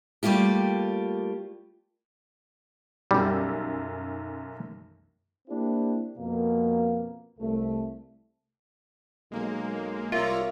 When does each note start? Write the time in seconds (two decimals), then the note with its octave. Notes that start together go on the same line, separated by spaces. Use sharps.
0.23 G3 A3 A#3 F4 G4
3.11 B1 F#2 G3
5.48 A#3 C4 D4 E4 G4
6.18 F2 B2 A#3
7.39 C2 A3
9.32 B1 G#3 A#3
10.12 C2 F4 A#4 C#5 D5 E5 F5 A#5